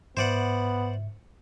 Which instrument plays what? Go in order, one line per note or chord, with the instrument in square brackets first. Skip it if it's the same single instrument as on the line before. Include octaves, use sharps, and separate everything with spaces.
[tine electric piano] G#2 E5 [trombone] B3 [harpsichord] C5 D5 F#5